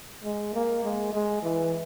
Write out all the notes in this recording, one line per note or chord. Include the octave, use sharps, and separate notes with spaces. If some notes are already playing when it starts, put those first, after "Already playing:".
G#3
A#3
G#3
G#3
E3